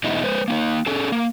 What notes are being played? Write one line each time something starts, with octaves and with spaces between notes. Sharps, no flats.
E2 B2 G#3 D#4 E4
G#3 B4 C5
A#3 C#4 D#4
C#4 G#4 A4
A#3